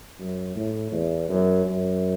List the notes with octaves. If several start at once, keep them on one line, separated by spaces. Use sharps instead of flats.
F#2
A2
E2
F#2
F#2